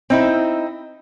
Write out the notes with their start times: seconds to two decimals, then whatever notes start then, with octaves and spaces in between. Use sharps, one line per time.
0.10 C4 D#4 E4